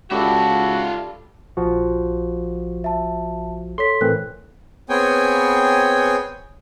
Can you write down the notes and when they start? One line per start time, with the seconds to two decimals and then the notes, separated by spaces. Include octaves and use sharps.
0.11 C#2 G3 F4 F#4 A4 E5
1.57 A#1 F3 F#4
2.84 E5 A5
3.78 A4 C#5 C6 B6
4.01 A2 E3 C4 A4 A#4 F#6
4.90 B3 C4 G#4 C#5 G5 G#5